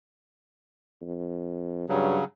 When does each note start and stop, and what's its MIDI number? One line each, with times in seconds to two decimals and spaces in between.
1.02 1.85 41
1.89 2.18 43
1.89 2.24 49
1.89 2.24 54